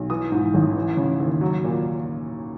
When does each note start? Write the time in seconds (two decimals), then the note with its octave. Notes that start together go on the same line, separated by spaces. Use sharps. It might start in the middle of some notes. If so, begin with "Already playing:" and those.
Already playing: B1
0.10 E3 D#6
0.32 G#2
0.54 A1
0.75 E3
0.97 C#3
1.20 D#2
1.41 F#3
1.64 A#2